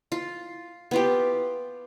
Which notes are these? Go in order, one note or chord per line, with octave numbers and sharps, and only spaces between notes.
F4
B3 F4 G4